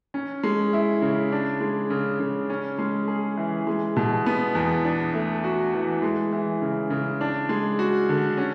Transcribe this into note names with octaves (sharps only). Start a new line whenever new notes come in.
C#4
G#3
E4
C#3
D4
G#3
C#3
C#3
C#4
G#3
G#4
E3
G#3
B2
B3
E2
D4
A3
F#4
E3
G#3
E3
C#3
C#3
D4
G#3
F#4
D3
C#4